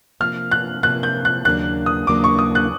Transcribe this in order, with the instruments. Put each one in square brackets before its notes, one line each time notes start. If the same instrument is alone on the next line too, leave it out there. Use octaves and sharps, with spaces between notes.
[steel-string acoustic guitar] C3 F3 A#3 [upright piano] F6
[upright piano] F#6
[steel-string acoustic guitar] C3 F3 A#3 [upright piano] F#6
[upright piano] G6
F#6
[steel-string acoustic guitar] D#2 C#3 F#3 A#3 D4 [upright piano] F#6
[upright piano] D#6
[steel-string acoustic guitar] D#2 C#3 F#3 A#3 D4 [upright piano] D6
[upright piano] C#6
D#6
F#6